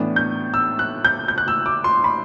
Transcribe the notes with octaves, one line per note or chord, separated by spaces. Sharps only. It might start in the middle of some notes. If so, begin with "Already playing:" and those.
Already playing: A2 E3 B3 D4
G6
E6
F#6
G6
G6
F#6
E6
D6
C6
B5